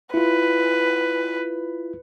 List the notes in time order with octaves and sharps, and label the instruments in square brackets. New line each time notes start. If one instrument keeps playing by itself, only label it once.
[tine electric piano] E4 F4 [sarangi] B4